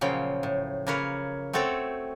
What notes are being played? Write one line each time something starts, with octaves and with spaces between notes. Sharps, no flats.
A#2 C#3 F3 F#3 G5
A2
C#3 A#3 A#4 B4 C#5
A3 C4 F#4 A4 C#5 G5